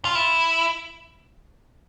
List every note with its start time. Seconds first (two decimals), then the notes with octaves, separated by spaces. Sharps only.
0.05 F4
0.15 E4